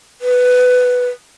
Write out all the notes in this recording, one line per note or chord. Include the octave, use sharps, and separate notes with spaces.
B4